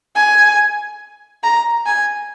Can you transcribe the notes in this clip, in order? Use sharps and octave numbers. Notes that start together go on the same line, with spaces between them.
G#5
A#5
G#5